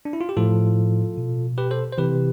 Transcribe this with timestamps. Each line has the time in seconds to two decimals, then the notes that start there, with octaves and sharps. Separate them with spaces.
0.05 D4
0.13 E4
0.21 F4
0.29 G4
0.37 A2 F3 F4 A4
1.17 B2
1.58 G4 B4
1.71 A4 C5
1.92 C5
1.98 C3 E3 G4 B4